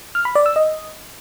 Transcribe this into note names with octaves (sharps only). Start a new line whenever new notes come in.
F6
B5
D5
E6
D#5